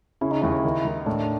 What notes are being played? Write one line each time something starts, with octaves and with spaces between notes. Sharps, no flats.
C#3 E4
D#4
D#2 E4
D#3
D#3
A2 D4